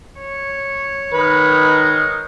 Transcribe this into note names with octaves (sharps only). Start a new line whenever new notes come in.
C#5
D#3 G#3 D#4 A#4 B4